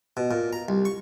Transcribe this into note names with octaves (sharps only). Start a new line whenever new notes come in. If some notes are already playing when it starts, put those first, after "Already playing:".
B2
A#2
A#5
C2
C#6